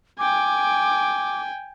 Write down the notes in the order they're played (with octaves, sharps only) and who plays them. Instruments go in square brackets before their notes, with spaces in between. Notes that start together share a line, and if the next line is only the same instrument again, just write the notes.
[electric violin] G5 G#5 [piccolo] D6